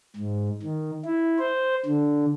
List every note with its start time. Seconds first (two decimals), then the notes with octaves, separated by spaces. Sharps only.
0.16 G#2
0.63 D#3
1.05 E4
1.39 C5
1.86 D3